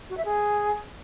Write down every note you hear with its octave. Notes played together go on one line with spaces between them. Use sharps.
F#4
E5
G#4